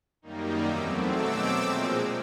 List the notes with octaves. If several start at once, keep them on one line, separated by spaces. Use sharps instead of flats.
F#2 D#3 G3 A#3 D#4
E2 B2 F#3 A3 C4 D6 E6
B2 F#3 A3 C4 D6 E6
A#2 F3 G#3 C4